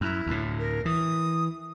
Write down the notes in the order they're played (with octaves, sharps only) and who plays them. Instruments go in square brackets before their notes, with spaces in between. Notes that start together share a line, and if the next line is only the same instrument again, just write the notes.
[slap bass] F#2 [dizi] E4
[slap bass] D2 A2
[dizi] A#4
[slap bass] E3 [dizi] D#6